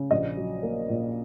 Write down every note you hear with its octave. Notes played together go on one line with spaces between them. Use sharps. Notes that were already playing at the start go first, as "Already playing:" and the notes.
Already playing: C#3
A#1 D#5
F#3
A#3
A#2